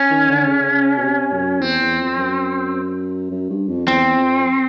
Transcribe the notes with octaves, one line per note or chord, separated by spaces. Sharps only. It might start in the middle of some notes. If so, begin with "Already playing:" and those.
Already playing: C#4
D#3
D3
C#3
B2
C3
F#2
E2 C4
E2
F2
F#2
F#2
G2
F2
E2 C4
F2